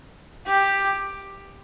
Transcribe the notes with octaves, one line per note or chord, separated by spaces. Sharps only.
G4